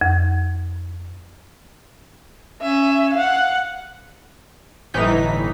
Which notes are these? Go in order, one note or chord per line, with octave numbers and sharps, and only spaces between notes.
F2
C#4 E5
F5 F#5
G1 A2 E3 D#4 B6